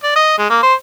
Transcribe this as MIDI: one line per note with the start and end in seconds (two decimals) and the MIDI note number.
0.04 0.12 74
0.16 0.34 75
0.38 0.50 56
0.50 0.61 58
0.63 0.74 72